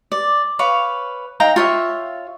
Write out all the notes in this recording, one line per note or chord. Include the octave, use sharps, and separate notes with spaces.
D5
B4 C#5 F5
D#4 F5 G5 A#5
F4 C#5 E5